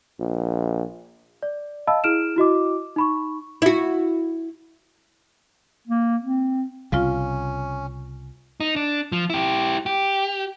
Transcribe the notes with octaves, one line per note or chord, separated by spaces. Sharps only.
A#1
D5
D#5 F5 A5 B5 E6
E4 G#4 F6 D7 E7
E4 F#4 D#5 D6
D#4 B5 C#6
E4 F#4
A#3
C4
C2 C#3 C#4 F4 F5
D#4
D4
F3
E4 G4
G4